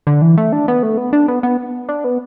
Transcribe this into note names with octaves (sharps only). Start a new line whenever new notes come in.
D3
E3
A3
D4
B3
A3
B3
D4
B3
B3
D4
B3